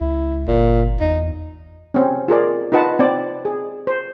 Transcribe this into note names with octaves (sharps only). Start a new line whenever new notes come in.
C#2 E4
G1 A#2
E2 D#4
C4 C#4
F4 G#4 A#4 D5
D#4 F4 B4 F#5 A5
C4 D5
G#4
C5